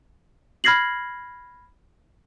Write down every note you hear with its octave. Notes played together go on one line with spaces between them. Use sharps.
B5 F6 G#6 A#6 C7 F#7